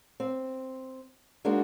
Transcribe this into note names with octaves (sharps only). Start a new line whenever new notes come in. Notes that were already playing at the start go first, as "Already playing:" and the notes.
C4
G#3 A#3 D4 D#4 F#4